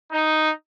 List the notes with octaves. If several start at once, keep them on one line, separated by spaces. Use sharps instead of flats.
D#4